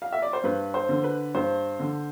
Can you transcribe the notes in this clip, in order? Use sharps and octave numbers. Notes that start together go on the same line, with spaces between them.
F5
E5
D5
C5
G2 B4
C5
D3
B4
G2 C5
D3